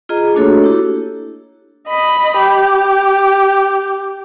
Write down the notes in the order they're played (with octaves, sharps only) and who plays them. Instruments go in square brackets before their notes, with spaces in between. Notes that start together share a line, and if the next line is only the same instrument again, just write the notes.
[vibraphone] F4 G#4 D#5 A#5
A3 A#3 D4 F#4 A4 C#5
E4 G4
[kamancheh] D#5 B5
G4